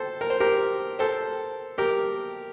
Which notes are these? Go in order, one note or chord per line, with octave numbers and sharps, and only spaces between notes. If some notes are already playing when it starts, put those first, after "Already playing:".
Already playing: A4 C5
A#4
C5
G4 A#4
A4 C5
G4 A#4